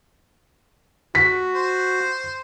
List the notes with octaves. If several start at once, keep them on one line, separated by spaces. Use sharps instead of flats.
F#4 B6
C5